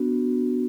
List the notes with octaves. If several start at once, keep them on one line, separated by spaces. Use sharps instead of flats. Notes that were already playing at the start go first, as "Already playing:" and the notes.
Already playing: B3 D4 F#4